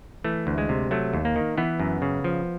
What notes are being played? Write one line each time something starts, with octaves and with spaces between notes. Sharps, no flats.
E3 A3
D2
G#3
C3
F#3 A3
D#2
A#3
D#3
E3 B3
F#2
C#3
F3